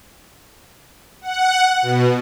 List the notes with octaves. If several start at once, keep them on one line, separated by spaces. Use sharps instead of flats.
F#5
B2